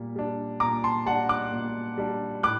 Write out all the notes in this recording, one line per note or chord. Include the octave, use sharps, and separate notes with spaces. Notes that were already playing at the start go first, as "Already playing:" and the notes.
Already playing: A#2 G3
G3 D4
A#2 A#5 D6
A5 C6
G3 D4 F#5 A5
D6 F#6
A#2
G3 D4
A2 D6 F#6